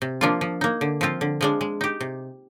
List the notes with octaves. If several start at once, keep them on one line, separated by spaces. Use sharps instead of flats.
C3
F3 A#3 D4 F4
F3
A#3 D#4
D3
F3 C4 F4
D3
F3 G#3 D4
G#3
D#4 G4
C3